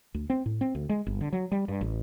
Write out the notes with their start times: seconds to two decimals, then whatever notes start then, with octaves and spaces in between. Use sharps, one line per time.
0.14 D2
0.30 C4
0.46 A2
0.61 C4
0.75 D2
0.89 G#3
1.07 G1
1.21 D3
1.33 F#3
1.52 G3
1.68 G2
1.81 A1